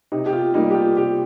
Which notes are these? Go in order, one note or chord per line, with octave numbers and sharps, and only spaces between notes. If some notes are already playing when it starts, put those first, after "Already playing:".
C3 D#4
G4
F4
G3 A#3 D#4
G4
F4
C3 G4